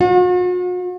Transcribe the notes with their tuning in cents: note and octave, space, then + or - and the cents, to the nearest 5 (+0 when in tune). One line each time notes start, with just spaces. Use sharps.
F#4 -45